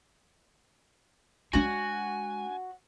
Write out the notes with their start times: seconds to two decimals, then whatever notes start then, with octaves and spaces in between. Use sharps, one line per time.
1.53 G#3 D4 F#4 C#5 F#5 G#5